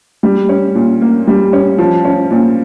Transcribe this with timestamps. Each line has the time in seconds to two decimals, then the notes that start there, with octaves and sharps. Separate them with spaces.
0.23 G3
0.49 C#4
0.75 A#2
1.01 A#3
1.27 G3
1.53 C#4
1.78 F3
2.05 C#4
2.31 A#2